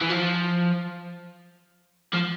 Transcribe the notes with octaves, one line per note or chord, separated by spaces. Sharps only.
E3
F3
F3